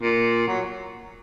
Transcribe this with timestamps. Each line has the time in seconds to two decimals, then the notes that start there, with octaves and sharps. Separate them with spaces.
0.02 A#2
0.48 F#3